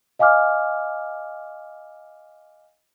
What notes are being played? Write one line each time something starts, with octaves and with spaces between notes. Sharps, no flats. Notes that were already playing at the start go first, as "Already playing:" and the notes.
D#5 F5 G#5 D6 F6